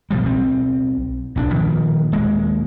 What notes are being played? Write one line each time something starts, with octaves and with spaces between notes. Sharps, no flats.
B2 F3 G3
B1 C4
B1 C4 D4
A#2 D#3 F3
D#1 G#3 A#3